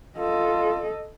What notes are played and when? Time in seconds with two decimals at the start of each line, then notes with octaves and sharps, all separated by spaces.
0.18 F4 A4 D#5